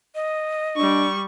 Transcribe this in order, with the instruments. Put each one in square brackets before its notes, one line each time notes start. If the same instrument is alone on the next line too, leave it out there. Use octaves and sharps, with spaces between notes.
[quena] D#5
[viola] G3 C#6 [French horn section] D4